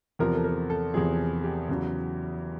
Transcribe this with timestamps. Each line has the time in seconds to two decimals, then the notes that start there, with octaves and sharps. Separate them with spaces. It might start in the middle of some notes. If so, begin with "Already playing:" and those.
0.19 E2 C3 F3 A#4
0.35 A4
0.44 A#4
0.70 A4
0.94 E2 C3 F3 G#4
1.44 G4
1.69 E2 C#3 F#3